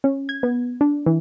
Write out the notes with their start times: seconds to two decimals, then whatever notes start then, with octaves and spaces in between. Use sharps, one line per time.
0.04 C#4
0.29 G#6
0.43 B3
0.81 D4
1.06 E3